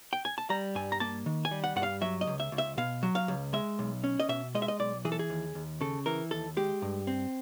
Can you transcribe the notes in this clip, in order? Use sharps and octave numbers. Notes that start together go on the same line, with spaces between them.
G5
G#5
A5
G3 A#5
G2 G#5
A#5
A#3 A5
D#3
G#5
G3
F#5
G2 F#5
F5
F#3 E5
D#5
C#2
E5
C#2
E5
B2 F5
F#3
F5
C#2
G#3 E5
B1
C#4
D#5
B2 E5
G#3 D#5
E5
D#5
B1 D5
E3 G#4
A4
G#4
D#2
D#2
C#3 A4
E3 A#4
D#2 A4
G#3 G4
G2
C4